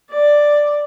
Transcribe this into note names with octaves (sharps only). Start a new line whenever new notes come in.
D5